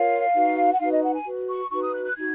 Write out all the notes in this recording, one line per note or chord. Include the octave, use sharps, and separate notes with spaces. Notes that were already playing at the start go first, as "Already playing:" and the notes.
Already playing: F4 A#4 C#5 F5
D#4 F#4 B4
F#5
D#4 F#4 B4 F5
D#5
F#5
G#5
F#4 B4
C#6
D#4 F#4 B4 C#6
D#6
F#6
F#6
D#4 F#4 G#6